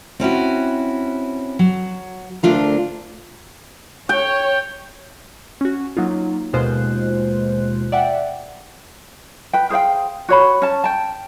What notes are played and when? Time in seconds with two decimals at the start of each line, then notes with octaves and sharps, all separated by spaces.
0.20 C4 C#4 E4 F#4
1.59 F#3
2.43 D2 B2 A3 D4 F4 A#4
4.09 C#5 G5
5.61 C#4 F#4
5.97 F#3 A#3 D#4 F4
6.53 D#2 B2 G#3 F4 C5 F#6
7.92 D5 E5 F#5 G5
9.53 B4 G5
9.70 G#4 C5 F5 G5
10.29 F#4 C#5 B5
10.62 C#4 A5
10.84 G5 A5